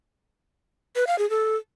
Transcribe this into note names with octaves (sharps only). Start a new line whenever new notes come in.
B4
F5
G#4
A4